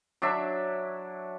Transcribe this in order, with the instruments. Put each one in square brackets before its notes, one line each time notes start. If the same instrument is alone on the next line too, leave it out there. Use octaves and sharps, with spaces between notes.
[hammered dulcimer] F#3 D4 E5